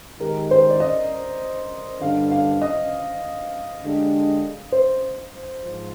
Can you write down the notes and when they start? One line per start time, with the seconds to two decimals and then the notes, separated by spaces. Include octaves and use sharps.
0.20 D#3 G#3 D#4 G4 A#4
0.51 C5
0.70 D5
0.80 D#5
2.01 G2 D3 G3 D4 F5
2.31 F5
2.62 D#5
3.82 D3 G#3 D4 G4
4.72 C5
5.64 G#2 F3